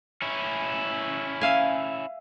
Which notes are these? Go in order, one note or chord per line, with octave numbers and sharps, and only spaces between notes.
C#4 E4
E5 F5 G#5